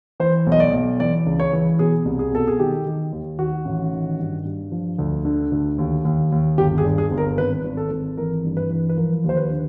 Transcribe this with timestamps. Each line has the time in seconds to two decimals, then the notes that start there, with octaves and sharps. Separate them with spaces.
0.20 E3 C5
0.47 B1
0.52 D#5
0.60 D5
0.73 B1
1.00 E3 D5
1.27 C#2
1.40 C#5
1.53 E3
1.79 B2 G#4
2.05 C2
2.19 G#4
2.32 B2 A4
2.48 G#4
2.59 D#3 G4
2.86 D#3
3.12 D#2
3.39 D#3 F#4
3.65 A1
3.93 D#3
4.19 G2
4.45 G2
4.72 F3
4.98 D2
5.25 D3
5.52 D2
5.78 D#2
6.05 D#2
6.32 D#2
6.58 G1 G4
6.78 G#4
6.84 G2
6.98 G#4
7.11 G1
7.18 A#4
7.38 G#1 B4
7.64 G#1
7.77 A4
7.91 G#1
8.17 E3 A#4
8.44 G2
8.57 B4
8.70 E3
8.89 B4
8.97 F3 A#4
9.24 D#2 C5
9.37 B4
9.50 D3